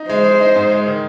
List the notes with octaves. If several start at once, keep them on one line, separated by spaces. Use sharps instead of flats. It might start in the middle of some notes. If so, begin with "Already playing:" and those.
Already playing: D#4
G#3 C5
G#3
D#4
G#2
G#3
D#3